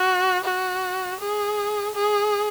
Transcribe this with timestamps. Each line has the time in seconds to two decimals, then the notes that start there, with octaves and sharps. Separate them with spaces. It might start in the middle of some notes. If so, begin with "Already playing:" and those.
Already playing: F#4
0.45 F#4
1.20 G#4
1.96 G#4